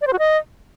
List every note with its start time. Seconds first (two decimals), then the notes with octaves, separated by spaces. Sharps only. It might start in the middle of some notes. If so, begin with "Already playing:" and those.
0.01 D5
0.07 C5
0.13 F#4
0.19 D#5